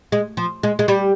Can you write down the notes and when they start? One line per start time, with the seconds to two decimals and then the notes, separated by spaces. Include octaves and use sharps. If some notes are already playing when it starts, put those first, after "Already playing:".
0.12 G#3
0.37 F3
0.63 G#3
0.79 G#3
0.88 G3